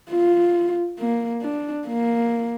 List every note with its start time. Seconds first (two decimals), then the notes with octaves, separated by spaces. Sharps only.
0.11 F4
0.99 A#3
1.42 D4
1.87 A#3